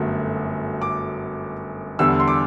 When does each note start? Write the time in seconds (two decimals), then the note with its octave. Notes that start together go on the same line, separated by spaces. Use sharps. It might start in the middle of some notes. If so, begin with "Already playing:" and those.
Already playing: G1 F#2 F#3 A3
0.82 D6
1.99 E2 D3 G3 E6
2.20 C6
2.28 D6